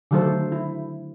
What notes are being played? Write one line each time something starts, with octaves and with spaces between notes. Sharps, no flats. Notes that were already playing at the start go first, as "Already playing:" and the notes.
D3 D#3 F#3 A3 A4 C5
E4